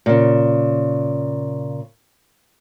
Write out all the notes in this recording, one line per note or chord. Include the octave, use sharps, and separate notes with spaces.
A#2 C#3